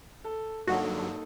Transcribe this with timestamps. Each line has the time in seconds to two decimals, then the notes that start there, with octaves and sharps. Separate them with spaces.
0.24 A4
0.67 G2 D3 F#3 A#3 D#4 F#4 A4